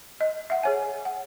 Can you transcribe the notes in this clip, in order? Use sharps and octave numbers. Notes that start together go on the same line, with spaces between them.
D#5
E5 F#5
G#4 C#5 G#5
F#5